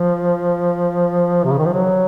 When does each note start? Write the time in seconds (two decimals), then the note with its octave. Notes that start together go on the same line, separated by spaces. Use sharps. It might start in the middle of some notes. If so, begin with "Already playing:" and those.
Already playing: F3
1.44 C3
1.52 C#3
1.58 D#3
1.66 F3
1.73 F#3